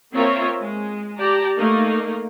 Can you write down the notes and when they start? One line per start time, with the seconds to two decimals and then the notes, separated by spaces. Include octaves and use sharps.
0.12 A#3 C4 F4 A#4 C#5 E5
0.59 G#3
1.19 G4 D5 A5 A#5
1.57 A3 A#3 D#4 A#4